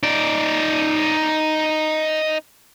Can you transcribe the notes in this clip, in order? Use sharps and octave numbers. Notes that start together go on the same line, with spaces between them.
D#4 D5